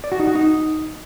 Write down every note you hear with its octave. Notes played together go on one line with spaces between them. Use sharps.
D5
F#4
D#4
F#4
D#4